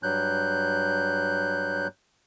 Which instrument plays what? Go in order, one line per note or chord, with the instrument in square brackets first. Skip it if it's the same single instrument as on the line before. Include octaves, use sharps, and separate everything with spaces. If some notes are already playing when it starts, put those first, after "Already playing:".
[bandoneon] G2 F#3 F#6 G6